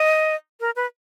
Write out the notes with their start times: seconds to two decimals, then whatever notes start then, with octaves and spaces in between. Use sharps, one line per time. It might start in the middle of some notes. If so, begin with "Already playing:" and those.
Already playing: D#5
0.60 A#4
0.76 B4